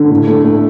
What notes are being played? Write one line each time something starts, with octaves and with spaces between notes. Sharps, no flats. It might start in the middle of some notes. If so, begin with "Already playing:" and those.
Already playing: D3
A2
A3
A3